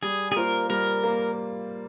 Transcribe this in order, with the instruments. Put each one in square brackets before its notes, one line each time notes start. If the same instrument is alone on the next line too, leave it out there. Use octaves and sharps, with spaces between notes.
[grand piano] G3 [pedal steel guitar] G#4
[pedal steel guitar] G#4
[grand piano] A#3 F4 C5 [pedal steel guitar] A#4
[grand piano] G3 [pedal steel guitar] A#4
[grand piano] A#3